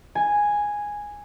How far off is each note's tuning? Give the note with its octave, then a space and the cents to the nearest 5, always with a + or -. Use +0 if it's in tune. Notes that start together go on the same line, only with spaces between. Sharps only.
G#5 -5